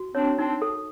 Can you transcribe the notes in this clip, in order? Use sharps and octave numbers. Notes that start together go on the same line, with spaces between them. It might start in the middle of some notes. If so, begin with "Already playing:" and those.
Already playing: F#4
C4 D4 C#5
C4 D4 D#4
A4